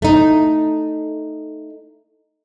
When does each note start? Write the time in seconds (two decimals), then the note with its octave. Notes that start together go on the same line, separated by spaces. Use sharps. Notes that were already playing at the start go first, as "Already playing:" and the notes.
0.02 A3 D#4